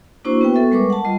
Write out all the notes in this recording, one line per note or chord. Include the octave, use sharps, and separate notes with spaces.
A#3 D4 E4 F#4 C5 C#6
B3 F#4 B4 G5
B3 A4 E5 C#6
G3 G#3 A#4 B4 C#6 D6
F#5 A5
G3 F4 D#5